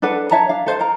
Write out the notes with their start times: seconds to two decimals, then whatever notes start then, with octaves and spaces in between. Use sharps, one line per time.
0.02 D4 A4 B4 F#5
0.31 C#5 E5 A5 A#5
0.49 D4 F5
0.66 A4 C5 F5
0.79 A#4 A#5